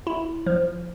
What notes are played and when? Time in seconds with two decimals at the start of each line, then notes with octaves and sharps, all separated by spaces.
0.07 E4
0.46 F3